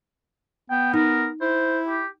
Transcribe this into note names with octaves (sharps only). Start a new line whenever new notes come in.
B3 G5
D#4 A#4
E4 C5
G4